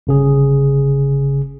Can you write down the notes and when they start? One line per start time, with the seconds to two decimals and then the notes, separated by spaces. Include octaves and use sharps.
0.07 G1 C#3 G#4